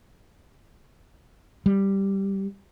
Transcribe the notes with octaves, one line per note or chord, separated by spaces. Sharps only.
G3